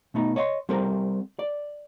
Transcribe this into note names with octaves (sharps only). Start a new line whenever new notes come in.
B2 A3 B3 D#4
C#5 D#5 E5 C6
G3 C4 A4 A#4 C5
D5